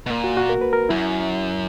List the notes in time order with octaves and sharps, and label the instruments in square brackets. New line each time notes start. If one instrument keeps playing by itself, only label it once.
[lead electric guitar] B2
[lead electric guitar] A#2 [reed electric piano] A#3
[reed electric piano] F#4
F#4
A#4
B4
A#4
[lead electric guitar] F#2 [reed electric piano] E4